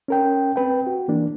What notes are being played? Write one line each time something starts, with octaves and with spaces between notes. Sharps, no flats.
C#4 A#4 G5
C4 B4 G5
F#4
E3 A#3 D4